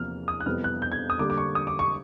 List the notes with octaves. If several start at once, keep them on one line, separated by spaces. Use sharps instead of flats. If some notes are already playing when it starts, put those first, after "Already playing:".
Already playing: E2 C3 F3 A#3 F6
D#6
F#6
F2 C3 E3 G3 B3 F6
F#6
G6
G#6
D#6
D3 G3 A#3 D4 D6
D6
C#6
D#6
D6
C#6